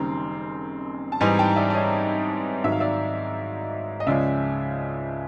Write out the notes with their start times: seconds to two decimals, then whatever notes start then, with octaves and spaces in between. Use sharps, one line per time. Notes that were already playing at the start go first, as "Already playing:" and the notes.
Already playing: F#1 F#2 D#3 G3 C4 A#5 C6
1.12 A5
1.20 G#2 E3 G3 C4 D#4 G#5 A#5
1.39 G5 A5
1.56 D5 E5
1.70 D5
1.74 C#5 D#5
2.64 G#2 D#3 F#3 E5
2.72 F5
2.80 D5 E5
4.00 D#5
4.06 C#2 C#3 F3 G#3 C#4 D5 E5